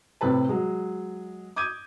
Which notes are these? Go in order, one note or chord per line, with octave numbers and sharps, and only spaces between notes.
A2 C3 C4 B4 A5
F#3 G#3
D6 D#6 G6 G#6 D#7